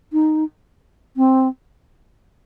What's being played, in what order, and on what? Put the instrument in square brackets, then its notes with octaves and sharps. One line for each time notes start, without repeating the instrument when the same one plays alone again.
[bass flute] D#4
C4